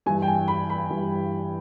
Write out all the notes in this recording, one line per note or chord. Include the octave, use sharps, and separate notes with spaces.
G2 E3 G#5
G5
G#5
B5
B5
G2 E3